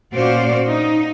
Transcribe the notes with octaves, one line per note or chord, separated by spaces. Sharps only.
A#2 C#4 F#4 C5 D5 F5
D#4